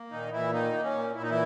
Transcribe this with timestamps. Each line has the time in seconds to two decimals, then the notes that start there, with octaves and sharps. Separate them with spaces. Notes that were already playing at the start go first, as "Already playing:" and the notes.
Already playing: A#3
0.11 A#2 D#3 D#4
0.32 A#2 E3 E4
0.52 D#3 A#3 D#4
0.73 A#3
0.84 C#4
0.94 A#2
1.15 A#2 E4
1.23 D#4
1.30 E3 E4